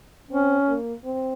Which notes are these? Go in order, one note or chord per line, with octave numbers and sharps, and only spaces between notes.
C4 C#4
A#3
C4